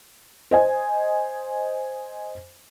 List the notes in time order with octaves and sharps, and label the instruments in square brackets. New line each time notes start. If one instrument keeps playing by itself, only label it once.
[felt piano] C5 D#5 G#5